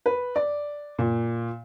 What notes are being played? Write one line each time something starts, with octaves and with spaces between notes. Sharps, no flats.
B4
D5
A#2